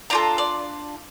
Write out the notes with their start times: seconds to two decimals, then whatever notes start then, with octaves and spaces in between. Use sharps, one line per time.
0.10 D4 F4 A4 A#5
0.38 D5